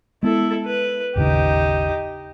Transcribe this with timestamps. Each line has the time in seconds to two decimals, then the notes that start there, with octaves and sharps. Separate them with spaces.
0.23 G#3 B3 E4 A4
0.65 B4
1.16 G#1 D#2 C#3 D#4 G4